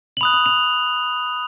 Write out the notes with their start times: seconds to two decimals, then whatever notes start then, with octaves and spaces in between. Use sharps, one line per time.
0.17 F#7
0.21 B5 D#6 F#6 F7
0.33 F#7
0.46 F7